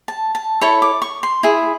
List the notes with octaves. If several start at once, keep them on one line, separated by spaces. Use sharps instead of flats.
A5
A5
E4 A4 C#5 B5
D6
C#6
C6
E4 G#4